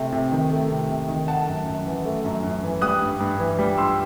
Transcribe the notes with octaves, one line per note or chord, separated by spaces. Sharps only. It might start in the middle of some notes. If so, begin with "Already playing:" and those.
Already playing: C3 A3
C3
D#3
A3
C3
C3
D#3
A3 F#5 A5
F#2
F#2
E3
A3
F#2
F#2
E3
G3 D#6 F#6
G2
G2
E3
G3
G2 C6 E6